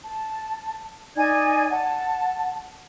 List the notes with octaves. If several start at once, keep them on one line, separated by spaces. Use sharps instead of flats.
A5
D#4 D5 G#5 G#6
F#5 A5